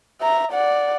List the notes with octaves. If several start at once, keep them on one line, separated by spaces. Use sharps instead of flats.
E5 A#5
D5 F#5